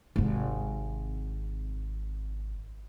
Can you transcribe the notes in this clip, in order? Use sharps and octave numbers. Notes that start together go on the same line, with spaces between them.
G#1 C3